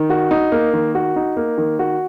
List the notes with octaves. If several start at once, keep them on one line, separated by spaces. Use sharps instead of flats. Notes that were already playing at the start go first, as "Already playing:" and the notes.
Already playing: D#3
F#4
D#4
A#3
D#3
F#4
D#4
A#3
D#3
F#4